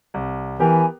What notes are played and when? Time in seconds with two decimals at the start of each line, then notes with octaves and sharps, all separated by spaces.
0.14 C2
0.60 E3 B3 G4 A#4 G#5